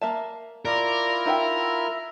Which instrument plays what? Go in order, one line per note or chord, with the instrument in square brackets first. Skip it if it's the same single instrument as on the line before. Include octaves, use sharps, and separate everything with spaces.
[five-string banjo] A#3 E5 A5
[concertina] E4 F4 [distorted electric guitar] A#4 [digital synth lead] D5
[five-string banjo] D#4 F#5 G5 [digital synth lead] E5